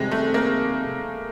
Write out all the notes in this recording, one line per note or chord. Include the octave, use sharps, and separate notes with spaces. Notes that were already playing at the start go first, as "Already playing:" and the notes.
Already playing: F2 C3 D#3 G3 G#3
A3
A#3